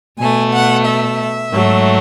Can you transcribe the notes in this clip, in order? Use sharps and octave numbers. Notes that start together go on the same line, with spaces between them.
B2 A3 G#5
F#5
E5
G#2 F#3 A3